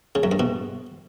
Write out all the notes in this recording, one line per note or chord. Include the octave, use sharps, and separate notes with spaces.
C#3
F#2
G2
B2